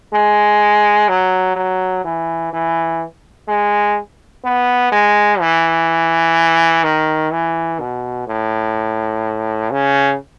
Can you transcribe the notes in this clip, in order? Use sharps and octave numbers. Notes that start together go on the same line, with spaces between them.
G#3
F#3
F#3
E3
E3
G#3
B3
G#3
E3
D#3
E3
B2
A2
C#3